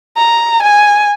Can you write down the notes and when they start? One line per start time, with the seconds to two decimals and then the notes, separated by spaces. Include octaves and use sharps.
0.17 A#5
0.63 G#5